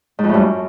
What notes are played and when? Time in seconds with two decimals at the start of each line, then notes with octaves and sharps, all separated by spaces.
0.19 G#2
0.24 F2
0.29 A2
0.34 G2
0.39 F#2